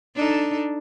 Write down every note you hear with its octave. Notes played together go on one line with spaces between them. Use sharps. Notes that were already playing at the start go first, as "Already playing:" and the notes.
D4 D#4 A4